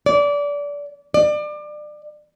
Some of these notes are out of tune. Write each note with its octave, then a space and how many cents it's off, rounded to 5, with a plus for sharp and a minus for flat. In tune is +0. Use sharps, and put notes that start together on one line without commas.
D5 -25
D5 +30